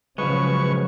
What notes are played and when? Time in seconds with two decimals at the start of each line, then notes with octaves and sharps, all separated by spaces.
0.18 C#3 F3 F#3 G#3 B4 C#6